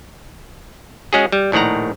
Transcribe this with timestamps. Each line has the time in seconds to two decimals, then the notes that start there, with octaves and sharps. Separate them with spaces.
1.13 G#3 C#4 F#4 G#4
1.32 G3
1.52 A#1 A2 D#3 F#5 A#5